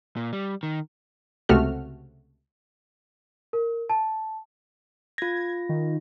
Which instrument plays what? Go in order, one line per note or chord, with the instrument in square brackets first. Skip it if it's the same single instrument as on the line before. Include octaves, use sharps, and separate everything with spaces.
[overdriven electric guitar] A#2
G3
D#3
[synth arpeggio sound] C#2 C3 A3 F#4 F6
[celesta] A#4
A5
[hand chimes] F4 A#6 [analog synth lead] G#6
[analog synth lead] D#3